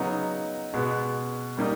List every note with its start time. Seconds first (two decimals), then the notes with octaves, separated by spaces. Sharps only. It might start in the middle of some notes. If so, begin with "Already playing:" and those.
Already playing: C#3 F#3 B3 D#4
0.73 B2 G#3 B3
1.57 G3 A#3 D#4